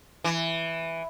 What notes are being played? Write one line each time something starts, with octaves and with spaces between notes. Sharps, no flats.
E3